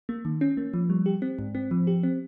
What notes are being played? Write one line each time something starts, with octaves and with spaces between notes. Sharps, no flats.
A#3
D#3
C#4
A#3
F3
G3
G4
C4
G#2
C4
F3
G4
C4